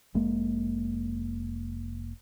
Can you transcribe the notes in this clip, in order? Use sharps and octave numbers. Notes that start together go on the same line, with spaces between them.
F1 G#3 A#3